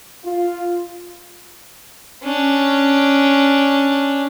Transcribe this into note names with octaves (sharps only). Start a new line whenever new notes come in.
F4
C#4 D4